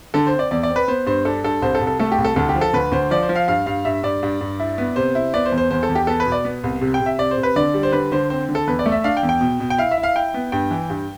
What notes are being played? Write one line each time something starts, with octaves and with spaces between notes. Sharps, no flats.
D3 A4
C5
C4
D5
E2 D5
D5
C4
B4
B3 C5
G2 C5
D4 A4
G2 A4
C2 C5
A4
C2
A4
A3 A4
G4
C2
A4
D2 A4
G4
F3
A4
D2 B4
D2 C5
F3 D5
C5
F3
F5
G2 F5
G2 F5
G2 E5
G2 D5
G2
G2
E4
B3
C3 C5
E4
B3 D5
C5
E2
C5
E2 C5
A4
E2
G4
B3 A4
B4
B2
D5
B3
C2
C3
G5
C3
E5
C3 D5
C5
C3
B4
D3 D5
G3
C5
D3 B4
D3 C5
C4 C5
D3
A4
E2 B4
D5
A3
E5
D4 F5
G5
E2
G5
B2
B2
G5
E4 F5
E5
E4
F5
E4 G5
B3
G2 G5
E3
G2